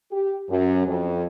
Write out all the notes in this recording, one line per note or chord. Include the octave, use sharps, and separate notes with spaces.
G4
F#2
F2